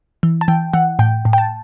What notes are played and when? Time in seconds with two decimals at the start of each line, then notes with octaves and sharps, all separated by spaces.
0.23 E3
0.41 A5
0.48 E3 G5
0.73 E3 F#5
0.99 A2 G5
1.25 A2
1.33 G5
1.38 A5